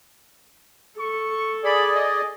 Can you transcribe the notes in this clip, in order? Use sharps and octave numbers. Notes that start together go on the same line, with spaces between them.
A4 C#6
G#4 D5 B5
D#5